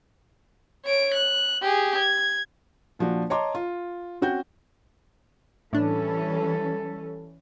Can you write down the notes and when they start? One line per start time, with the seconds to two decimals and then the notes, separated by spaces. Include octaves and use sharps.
0.84 C#5 D7
1.14 F#6
1.61 G4 G#4
1.97 G#6
2.99 A#2 F3 D4 F#4
3.30 C#5 D#5 A5 A#5 C6 D6
3.55 F4
4.21 C4 C#4 F#4 G5 G6
5.73 A2 E3 G3 C#4 D4 A4